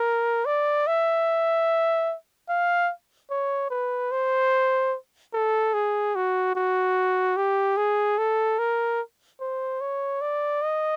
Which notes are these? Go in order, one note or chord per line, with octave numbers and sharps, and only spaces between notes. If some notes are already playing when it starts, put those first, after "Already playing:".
Already playing: A#4
D5
E5
F5
C#5
B4
C5
A4
G#4
F#4
F#4
G4
G#4
A4
A#4
C5
C#5
D5
D#5